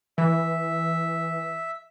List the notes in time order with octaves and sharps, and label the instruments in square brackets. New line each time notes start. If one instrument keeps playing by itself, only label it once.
[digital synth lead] E3 [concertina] E5